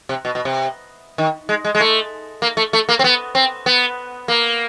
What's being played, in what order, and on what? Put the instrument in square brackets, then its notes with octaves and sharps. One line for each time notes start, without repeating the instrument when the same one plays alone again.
[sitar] C3
B2
B2
C3
D#3
G#3
G#3
G#3
A3
A#3
A3
A3
A#3
C4
B3
C4
B3
A#3